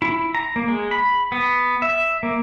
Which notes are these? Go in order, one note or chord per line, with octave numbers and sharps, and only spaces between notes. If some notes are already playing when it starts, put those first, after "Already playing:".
E4
A#5
A#3
G#3
B5
B3
E5
A#3